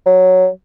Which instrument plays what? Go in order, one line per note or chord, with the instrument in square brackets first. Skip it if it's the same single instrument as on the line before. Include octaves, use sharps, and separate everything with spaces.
[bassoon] F#3